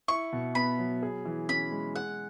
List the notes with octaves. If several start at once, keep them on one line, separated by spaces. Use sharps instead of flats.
E4 C#6
B2
B3 B5
F#3
G#4
E3
C#4 B5
G#3
G#4 F#5